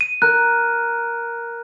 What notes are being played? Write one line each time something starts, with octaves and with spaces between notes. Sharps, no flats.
D#7
A#4 F#6